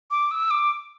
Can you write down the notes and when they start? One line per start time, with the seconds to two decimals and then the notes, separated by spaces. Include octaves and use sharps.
0.11 D6
0.31 E6
0.50 D6